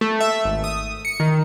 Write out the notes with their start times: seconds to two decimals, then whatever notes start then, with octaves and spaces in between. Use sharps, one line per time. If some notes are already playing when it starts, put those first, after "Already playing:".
0.01 A3
0.20 E5
0.44 G#1
0.64 D#6
1.05 C#7
1.20 D#3